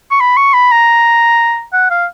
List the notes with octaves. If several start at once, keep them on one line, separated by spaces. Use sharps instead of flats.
C#6
B5
C#6
B5
A#5
F#5
F5